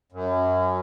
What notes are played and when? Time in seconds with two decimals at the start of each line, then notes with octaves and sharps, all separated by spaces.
0.12 F#2